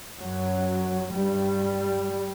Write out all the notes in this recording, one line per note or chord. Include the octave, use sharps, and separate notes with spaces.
F#2 F#3
G2 G3